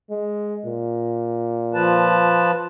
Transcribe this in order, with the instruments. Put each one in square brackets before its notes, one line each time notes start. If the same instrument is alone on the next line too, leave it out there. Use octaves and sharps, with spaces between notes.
[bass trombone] G#3
A#2
[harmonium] F3 B4 A5